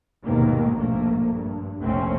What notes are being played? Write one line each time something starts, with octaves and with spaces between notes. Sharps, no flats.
F1 D#2 G#2 B2 D#3 A#3
A#1 G#2 A3 A#3
G2
F1 A#1 A3 C4 C#4